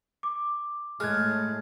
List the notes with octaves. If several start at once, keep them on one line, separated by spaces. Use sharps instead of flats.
D6
A2 G#3 F6 F#6 G#6